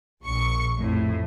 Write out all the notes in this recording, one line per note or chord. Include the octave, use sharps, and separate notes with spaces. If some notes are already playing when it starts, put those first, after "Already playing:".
A#1 C#6
F2 A2